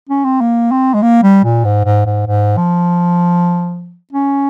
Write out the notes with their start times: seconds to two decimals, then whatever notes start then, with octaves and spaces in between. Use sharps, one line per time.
0.09 C#4
0.24 C4
0.41 A#3
0.71 C4
0.94 G#3
1.02 A#3
1.23 G3
1.44 A#2
1.64 G#2
1.85 G#2
2.06 G#2
2.27 G#2
2.57 F3
4.13 C#4